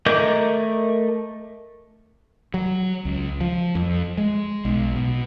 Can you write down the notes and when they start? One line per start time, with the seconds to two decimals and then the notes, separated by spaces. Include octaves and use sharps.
0.06 A3 A#4 D#5 D6 G6
2.54 F#3
3.05 C#2
3.41 F3
3.75 F2
4.18 G#3
4.65 B1
4.96 B2